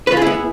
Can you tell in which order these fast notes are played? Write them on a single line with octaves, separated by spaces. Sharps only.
B4 F4 G#4 E4 B3